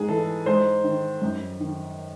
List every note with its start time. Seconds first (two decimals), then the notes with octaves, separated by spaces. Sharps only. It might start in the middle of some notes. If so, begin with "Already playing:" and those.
Already playing: G#2 G#4
0.08 E3 A4
0.46 G#2 C5
0.84 D#3
1.22 F#2
1.60 D#3